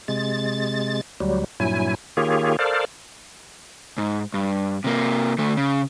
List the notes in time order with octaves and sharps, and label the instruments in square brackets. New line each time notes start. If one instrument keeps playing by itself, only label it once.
[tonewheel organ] C3 G#3 A6
D2 F#3 G3
G2 A#2 F#3 E4 G#5
D#3 A#3 F4 G4 G#4 C#5
A4 A#4 C5 D5 F5
[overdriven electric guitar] G#2
G2
C3 A#3
D2 A3
C#3